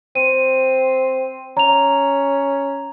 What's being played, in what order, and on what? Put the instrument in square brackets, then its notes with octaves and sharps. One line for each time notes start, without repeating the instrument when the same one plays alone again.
[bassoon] C4 [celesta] D#7
[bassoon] C#4 [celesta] A#5 F7